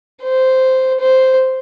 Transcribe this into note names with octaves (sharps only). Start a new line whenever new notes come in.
C5
C5